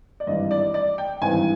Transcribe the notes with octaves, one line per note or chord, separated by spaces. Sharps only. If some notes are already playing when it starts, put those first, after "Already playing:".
D5
G#1 G2 E3 D#5
D5
D5
G5
G#1 G2 E3 G#5